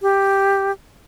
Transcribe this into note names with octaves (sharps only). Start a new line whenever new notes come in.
G4